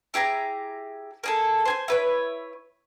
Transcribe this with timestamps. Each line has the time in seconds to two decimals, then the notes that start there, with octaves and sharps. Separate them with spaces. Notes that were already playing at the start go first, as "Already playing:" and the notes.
0.14 E4 G4 G#4 A#5
1.24 A#3 G#4 A4
1.65 C5 G#5 C6
1.88 E4 B4 C#5